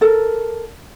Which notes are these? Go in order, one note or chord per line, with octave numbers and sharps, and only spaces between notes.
A4 A#4